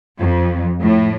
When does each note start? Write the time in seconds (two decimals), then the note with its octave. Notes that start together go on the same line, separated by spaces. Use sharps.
0.18 F2
0.81 A2